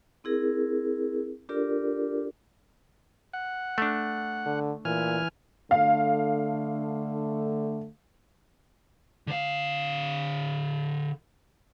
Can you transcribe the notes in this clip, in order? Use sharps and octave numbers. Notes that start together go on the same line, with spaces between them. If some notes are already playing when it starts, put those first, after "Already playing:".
C4 E4 G#4 A#4
D4 F4 G4 A4 A#4 D5
F#5
A3 D4
D3
A#2 E3 G#5 F6
D3 A3 F5
D3 F5